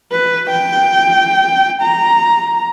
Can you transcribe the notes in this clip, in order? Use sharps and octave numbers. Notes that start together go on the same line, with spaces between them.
B4
G5
A#5